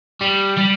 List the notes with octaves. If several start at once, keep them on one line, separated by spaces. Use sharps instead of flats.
G3
G3